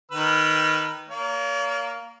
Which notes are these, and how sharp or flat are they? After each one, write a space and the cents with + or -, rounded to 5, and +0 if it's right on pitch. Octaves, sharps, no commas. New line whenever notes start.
D#3 +0 B4 +0 E6 +45
A#3 +0 C#5 +45